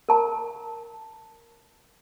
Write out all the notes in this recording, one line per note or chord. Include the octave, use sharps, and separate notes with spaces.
A#4 A5 A#5